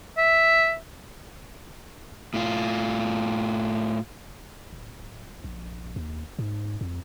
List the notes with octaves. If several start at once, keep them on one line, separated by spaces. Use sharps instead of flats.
E5
A2 F4
D1
A#1
D#2
G#2
F2